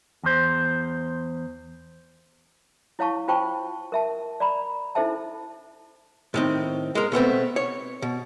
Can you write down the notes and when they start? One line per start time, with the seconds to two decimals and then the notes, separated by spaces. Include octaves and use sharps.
0.23 E2 C5
2.99 E4 C#5 F5 A5 C#6
3.28 F4 C5 G5 A5 C#6
3.92 A#4 E5 A5
4.40 D5 A#5 B5
4.95 D#4 E4 A4 C5 E5 A5
6.34 A2 D#3 C4
6.95 G#3 A#4
7.12 B2 A3 B3 C4
7.56 C#5
8.02 B2